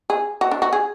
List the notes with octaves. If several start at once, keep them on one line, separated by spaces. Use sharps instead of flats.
G#4
F#4
D4
F#4
G#4